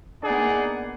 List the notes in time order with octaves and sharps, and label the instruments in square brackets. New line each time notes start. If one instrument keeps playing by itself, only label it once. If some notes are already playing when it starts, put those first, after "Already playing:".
[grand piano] D4 [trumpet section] D#4 G#4 D5 F#5
[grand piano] B3
A#3
B3